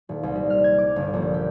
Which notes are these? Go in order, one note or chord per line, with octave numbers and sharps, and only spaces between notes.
D#1
C2
G3
F6
G#6
D6
G1
A#1
G4